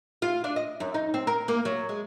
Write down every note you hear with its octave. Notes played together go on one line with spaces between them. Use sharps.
F4
D4
D#5
F#2
D#4
C4
A#4
A#3
F#3
G#3